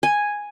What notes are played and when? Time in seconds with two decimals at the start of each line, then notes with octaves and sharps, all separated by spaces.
0.03 G#5